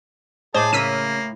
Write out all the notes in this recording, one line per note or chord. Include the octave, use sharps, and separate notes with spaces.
A2 G#4 C5 D#5 A5 D6
C#3 A#3 E6 B6 D#7